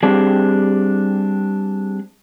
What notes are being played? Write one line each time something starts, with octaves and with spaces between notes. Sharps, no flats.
G3 C4 D4 G4 G#4